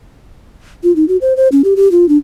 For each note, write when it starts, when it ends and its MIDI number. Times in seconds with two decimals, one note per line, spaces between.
0.83 0.94 65
0.96 1.07 63
1.08 1.17 66
1.21 1.36 72
1.37 1.48 72
1.52 1.62 61
1.64 1.74 67
1.76 1.91 67
1.91 2.08 65
2.09 2.18 62